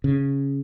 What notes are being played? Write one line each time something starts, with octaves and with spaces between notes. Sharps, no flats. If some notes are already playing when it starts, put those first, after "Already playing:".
C#3